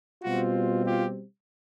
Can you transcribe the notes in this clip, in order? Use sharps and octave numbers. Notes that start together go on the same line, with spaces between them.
B2 G3 C4 F4 F#4
F4 G4